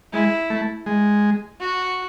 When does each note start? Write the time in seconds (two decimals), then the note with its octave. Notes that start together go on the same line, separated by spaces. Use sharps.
0.13 G#3 E4
0.50 A3
0.86 G#3
1.60 F#4